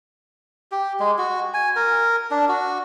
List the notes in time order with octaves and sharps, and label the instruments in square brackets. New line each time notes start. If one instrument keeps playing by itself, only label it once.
[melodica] G4
G#3
F#4
G#5
A#4
D4
F#4